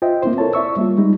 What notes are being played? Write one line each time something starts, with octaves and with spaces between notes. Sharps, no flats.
F4 C5 D#5 E5 G5
A#3 C4 E4 C5
E4 A4 A#4 C#5 A5
D5 E5 C#6 E6
G3 A#3 F4
G3 G#3 D#4